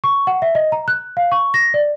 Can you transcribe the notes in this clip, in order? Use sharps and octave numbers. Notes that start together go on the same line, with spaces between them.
C#6
F#5
E5
D#5
A#5
F#6
F5
C#6
A#6
D5